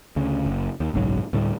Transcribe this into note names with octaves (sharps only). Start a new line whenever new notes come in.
D2 C#3
F#1
D#2
F#1 B1 G#2 F#3
D2 A2 G3